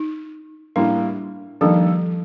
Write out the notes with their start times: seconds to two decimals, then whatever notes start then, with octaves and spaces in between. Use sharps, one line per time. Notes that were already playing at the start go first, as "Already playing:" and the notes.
Already playing: D#4
0.76 A2 G3 A#3 D4
1.61 D#3 F3 G3 A#3 D4 A4